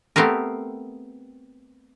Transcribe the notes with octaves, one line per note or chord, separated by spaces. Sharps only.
A3 B3 C4 G4 A#4